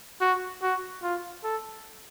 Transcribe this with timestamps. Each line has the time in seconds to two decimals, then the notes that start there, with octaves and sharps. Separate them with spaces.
0.21 F#4
0.63 F#4
1.03 F4
1.44 A4